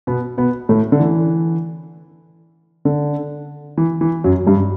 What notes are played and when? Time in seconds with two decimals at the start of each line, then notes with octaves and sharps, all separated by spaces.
0.07 B2 B3
0.37 B2 B3
0.69 A2 A3
0.92 D3
0.99 E3
2.85 D3
3.77 E3
4.01 E3
4.24 F#2 F#3
4.46 G2 G3